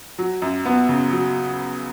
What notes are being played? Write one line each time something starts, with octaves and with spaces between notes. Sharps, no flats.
F#3
F#2
B3
C#3
F#3